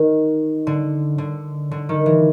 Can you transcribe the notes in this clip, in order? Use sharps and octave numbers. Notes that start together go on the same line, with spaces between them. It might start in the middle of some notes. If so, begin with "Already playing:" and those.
Already playing: D#3
D3
D3
D3
D#3
E3